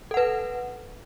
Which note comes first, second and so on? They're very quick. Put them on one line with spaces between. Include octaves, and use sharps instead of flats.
A4 F#5 B4